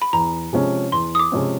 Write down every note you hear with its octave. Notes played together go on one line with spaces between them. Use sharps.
B5
E2 A#5
C3 F3 G#3 C#4
E2 C6
D#6
D6
C3 F3 G#3 C#4